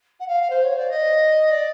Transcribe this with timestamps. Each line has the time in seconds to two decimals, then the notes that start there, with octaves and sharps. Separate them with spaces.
0.20 F#5
0.27 F5
0.50 C5
0.64 C#5
0.77 D5
0.89 D#5
1.51 D5